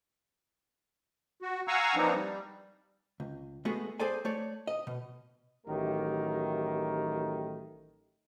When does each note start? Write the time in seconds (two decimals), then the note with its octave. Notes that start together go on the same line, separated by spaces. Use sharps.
1.42 F#4
1.68 F5 F#5 G#5 A#5 C#6 E6
1.95 E3 F3 A#3 C4 D4 D#4
2.14 G3
3.20 C#2
3.65 G#3 A3 B3 F#4 G#4
4.00 G#4 A4 C5 D5 G#5
4.25 A3 C#5 D5
4.67 D#5
4.87 B2
5.65 A1 D#3 F#3 A3 G4 A#4